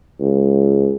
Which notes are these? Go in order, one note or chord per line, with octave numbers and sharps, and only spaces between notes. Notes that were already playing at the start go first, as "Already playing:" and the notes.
C#2